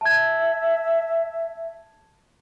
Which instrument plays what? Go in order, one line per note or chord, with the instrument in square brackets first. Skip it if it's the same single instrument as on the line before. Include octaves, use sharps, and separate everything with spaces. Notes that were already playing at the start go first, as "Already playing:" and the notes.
[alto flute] E5 [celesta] A5 G#6